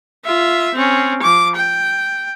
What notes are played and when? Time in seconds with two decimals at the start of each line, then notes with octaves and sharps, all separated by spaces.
0.25 F4 E5
0.75 C4 C#4
1.22 F3 D6
1.56 G5